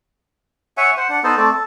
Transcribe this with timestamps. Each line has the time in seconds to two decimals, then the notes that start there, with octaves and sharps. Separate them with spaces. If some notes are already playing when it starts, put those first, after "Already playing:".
0.77 C#5 E5 F#5 G#5
0.97 C5 F#5
1.09 D4 F#5
1.23 B3 D#4 A4 C5
1.37 A3 C4 A4 D5
1.50 A4